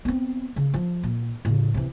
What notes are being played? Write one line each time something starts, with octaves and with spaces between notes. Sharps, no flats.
B3 C4
C#3
F3
A#2
A2 C#3
C3 E3